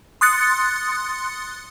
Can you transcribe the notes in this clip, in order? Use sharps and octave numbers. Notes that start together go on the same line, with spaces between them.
C6 D#6 F#6 A6 C#7